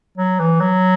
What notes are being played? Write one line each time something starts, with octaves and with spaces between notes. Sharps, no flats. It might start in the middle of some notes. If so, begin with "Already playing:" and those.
F#3
E3
F#3